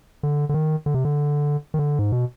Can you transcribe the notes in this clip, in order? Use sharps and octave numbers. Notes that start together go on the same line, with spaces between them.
D3
D3
D#3
D3
C3
D3
D#3
D3
G#2
B2